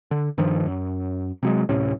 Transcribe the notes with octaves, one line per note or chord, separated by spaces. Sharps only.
D3
G2 D#3 F3
F#2
C3 F#3 G#3
D1 A2 C3 C#4